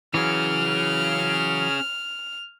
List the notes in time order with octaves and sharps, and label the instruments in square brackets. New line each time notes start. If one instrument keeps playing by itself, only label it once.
[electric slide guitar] E3 F#3 [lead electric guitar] C#4 G#4 [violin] F6